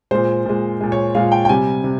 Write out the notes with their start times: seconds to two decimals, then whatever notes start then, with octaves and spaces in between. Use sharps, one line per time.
0.11 A#2 G#3 C5
0.46 A#2 G#3
0.81 A#2 G#3
0.92 C#5
1.15 A#2 G#3 F5
1.32 G5
1.45 G5
1.49 C3 G3 G#5
1.84 C3